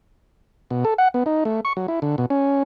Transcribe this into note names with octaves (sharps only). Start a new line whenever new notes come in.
B2
A4
F#5
B3
D#4
A3
C#6
F#3
E4
D3
B2
C#4